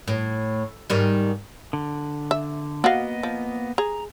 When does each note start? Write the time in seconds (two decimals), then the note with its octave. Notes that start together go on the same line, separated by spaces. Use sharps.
0.08 A2
0.90 G#2 D#3 G3
1.73 D3
2.31 E5
2.84 A#3 B3 F#4 D#5 F5
3.23 F3
3.78 G#4 A#5